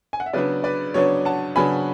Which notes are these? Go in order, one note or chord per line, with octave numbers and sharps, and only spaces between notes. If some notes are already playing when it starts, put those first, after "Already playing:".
G#5
F#5
E5
C#3 F#3 B3 D4 B4 D5
B4 D5
C#3 F#3 B3 D4 C#5
F#5 A5
C#3 F#3 B3 D4 G#5 B5